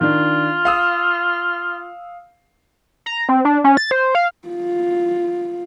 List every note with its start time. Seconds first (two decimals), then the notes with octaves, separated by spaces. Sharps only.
0.01 D#3 D4 F4
0.65 F5 D#6 E6
3.06 A#5
3.29 C4
3.45 D4
3.64 C#4
3.77 A6
3.91 C5
4.15 F5
4.48 F4